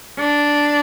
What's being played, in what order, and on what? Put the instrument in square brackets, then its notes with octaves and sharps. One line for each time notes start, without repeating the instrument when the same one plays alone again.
[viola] D4